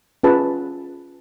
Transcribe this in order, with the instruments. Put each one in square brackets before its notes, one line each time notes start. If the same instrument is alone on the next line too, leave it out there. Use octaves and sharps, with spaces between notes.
[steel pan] C#4 F4 G#4 B4 A5